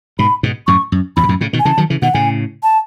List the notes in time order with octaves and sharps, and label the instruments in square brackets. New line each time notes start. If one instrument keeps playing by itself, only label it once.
[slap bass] G#2 B2 [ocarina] B5
[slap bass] G#2 B2
[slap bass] F#2 A2 [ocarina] C#6
[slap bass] F#2
[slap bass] E2 G#2 [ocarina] B5
[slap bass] B2
F#2 A2
A2 C#3
B2 D#3
[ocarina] G#5
[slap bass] C#3 E3 [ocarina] A5
[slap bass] D#3 F#3
C#3 E3
[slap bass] B2 D#3 [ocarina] F#5
[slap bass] A2 C#3 [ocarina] G#5
[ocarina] A5